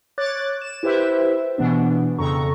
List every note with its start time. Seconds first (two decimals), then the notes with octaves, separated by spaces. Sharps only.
0.18 C#5 D6 F#6 A6
0.62 E7
0.83 E4 G4 B4 C5 E5
1.58 B2 E3 B3 D4
2.19 F2 C#3 A4 A#5 C#6